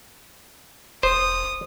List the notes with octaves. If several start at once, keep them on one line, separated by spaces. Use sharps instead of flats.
E1 C5 D#6